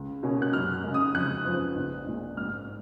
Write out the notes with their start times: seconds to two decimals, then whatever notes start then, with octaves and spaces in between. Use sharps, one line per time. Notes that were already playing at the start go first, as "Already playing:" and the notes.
Already playing: C#2
0.23 B2 A#3 C#4
0.42 F#6
0.53 F#2 F6
0.84 C#3 G#3
0.94 D#6
1.15 F2 F#6
1.45 C#3 F3 B3
1.76 A#1
2.07 A#2 G#3
2.37 G#2 F6